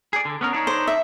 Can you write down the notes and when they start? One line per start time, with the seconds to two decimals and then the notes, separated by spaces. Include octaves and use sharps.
0.13 G#4 D5
0.25 D3
0.41 B3 C#4 A#4
0.53 D4 D#4 C#5
0.67 C5
0.87 E5